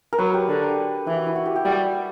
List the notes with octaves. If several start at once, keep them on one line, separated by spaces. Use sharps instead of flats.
A#4
F#3 B4
G4
D3
E3 E4
F#4
E4
F#4
G4
G4
G3 F#4